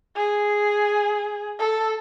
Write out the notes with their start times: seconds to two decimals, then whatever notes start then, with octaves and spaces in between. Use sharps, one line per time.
0.16 G#4
1.59 A4